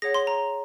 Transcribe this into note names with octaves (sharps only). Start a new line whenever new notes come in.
G#4 C#5 F#5 A#6
C6
A#5